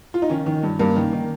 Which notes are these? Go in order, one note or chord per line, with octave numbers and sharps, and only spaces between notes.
F4
D#4
D#3 C#4
D#3
G2
G2 A#3
D#3
D#3